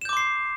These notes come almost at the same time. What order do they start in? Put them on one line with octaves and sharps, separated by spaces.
E7 G6 D6 C6 C7